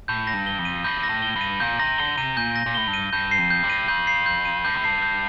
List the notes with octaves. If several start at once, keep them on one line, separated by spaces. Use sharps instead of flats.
A2 G6
A#6
G2
G7
F2
D#7
G2 G6
A#6
A2
G7
G2
D#7
A#2 G6
C3 A#6
D3 G7
C3 D#7
A#2 G6
A#6
A#2
A2 G7
G2
D#7
G2 G6
C7
F2
G6
G2
D#7
F2 G6
C7
G6
D#7
G2 G6
A2
G2 C7
G6